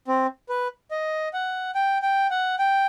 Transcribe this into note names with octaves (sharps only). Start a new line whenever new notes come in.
C4
B4
D#5
F#5
G5
G5
F#5
G5